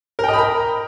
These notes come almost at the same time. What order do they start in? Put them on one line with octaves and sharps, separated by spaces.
A#4 G5 D#5 B5 A#5